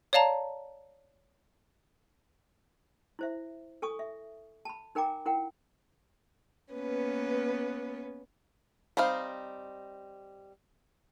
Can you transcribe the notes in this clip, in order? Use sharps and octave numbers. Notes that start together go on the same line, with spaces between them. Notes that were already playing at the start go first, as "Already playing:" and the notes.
C#5 D5 F5 A5 A#5
E4 C5 E5
A4 G#5 C#6 D#6
E5
A5 B5
D#4 A#4 G5 G#5 A#5 D6
E4 A#4 F#5 G5
A#3 B3 C#4 B4
G3 C4 D#4 F5